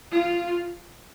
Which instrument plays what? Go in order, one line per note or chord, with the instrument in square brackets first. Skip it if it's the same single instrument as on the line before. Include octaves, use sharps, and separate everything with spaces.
[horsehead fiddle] F4